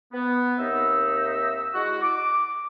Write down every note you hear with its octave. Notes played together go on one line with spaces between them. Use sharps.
B3
D#2 C4 D#4 E5 E6
G#3 E4 F#4
D6